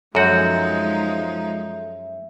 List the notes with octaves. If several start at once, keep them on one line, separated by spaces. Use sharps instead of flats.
F#2 F3 G#3 D#4 F#4 A4 E5 G6